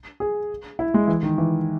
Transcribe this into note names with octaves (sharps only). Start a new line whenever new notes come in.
G#4
E4
G#3
E3
D#3
E3